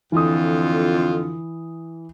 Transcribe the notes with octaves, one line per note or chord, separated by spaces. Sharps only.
F2 D3 E3 F4 D#6